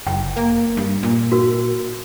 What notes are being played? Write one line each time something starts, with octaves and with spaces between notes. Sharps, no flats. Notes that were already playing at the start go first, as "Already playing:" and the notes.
F#1 G5
A#3
G2
A#2
F#4 A#4